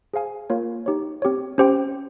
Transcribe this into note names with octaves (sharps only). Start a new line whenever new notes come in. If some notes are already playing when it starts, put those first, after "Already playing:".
G#4 C5 F5 G#5
A#3 F4 A#4 C#5 F5
D#4 G4 C#5
C4 G4 C#5
C#4 G4 C5 G5